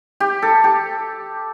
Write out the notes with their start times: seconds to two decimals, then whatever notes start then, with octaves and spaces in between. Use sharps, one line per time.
0.20 G4
0.42 A4
0.64 G4